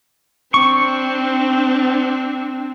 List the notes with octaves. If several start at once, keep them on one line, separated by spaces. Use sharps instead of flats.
C4 D4 C#6